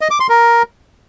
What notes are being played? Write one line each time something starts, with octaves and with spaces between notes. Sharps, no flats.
D#5
D6
C6
A#4